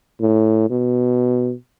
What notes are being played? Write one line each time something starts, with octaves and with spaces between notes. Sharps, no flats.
A2
B2